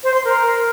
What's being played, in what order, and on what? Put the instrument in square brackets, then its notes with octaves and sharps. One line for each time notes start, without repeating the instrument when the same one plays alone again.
[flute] C5
C6
A#4